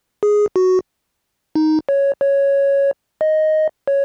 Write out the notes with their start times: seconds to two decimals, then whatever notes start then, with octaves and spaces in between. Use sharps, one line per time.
0.23 G#4
0.56 F#4
1.55 D#4
1.89 C#5
2.21 C#5
3.21 D#5
3.88 C#5